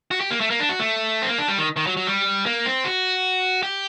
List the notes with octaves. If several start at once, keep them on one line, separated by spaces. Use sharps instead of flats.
F#4
G4
A#3
A3
A#3
D4
F#4
A3
C4
A#3
D4
G3
D#3
D#3
F#3
F#3
G3
A#3
C4
F#4
G4